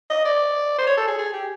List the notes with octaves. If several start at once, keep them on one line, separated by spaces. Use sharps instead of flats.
D#5
D5
C5
C#5
A4
G#4
G#4
G4